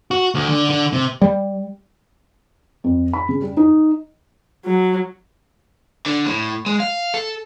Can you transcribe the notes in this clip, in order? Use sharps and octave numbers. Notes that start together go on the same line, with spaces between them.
F#4
D2
D3
D3
C3
G3
F2
B5
C#3
G3
D#4
F#3
D3
A2
G#3
F5
A4